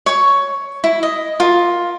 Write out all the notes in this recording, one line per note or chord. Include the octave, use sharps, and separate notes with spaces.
C#5 C#6
E4
D#5
F4 A#4